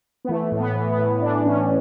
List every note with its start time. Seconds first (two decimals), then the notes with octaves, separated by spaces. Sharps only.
0.25 B3
0.28 E3 A3
0.52 A2
0.60 B3
0.75 E3
0.91 B3
0.98 A2
1.21 E3 D4
1.44 A2 C#4